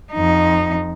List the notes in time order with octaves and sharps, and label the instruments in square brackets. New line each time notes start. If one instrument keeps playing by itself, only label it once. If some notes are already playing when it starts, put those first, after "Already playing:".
[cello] F2 D#4